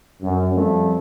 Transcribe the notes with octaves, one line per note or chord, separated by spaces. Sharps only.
F#2
F2 G3 A3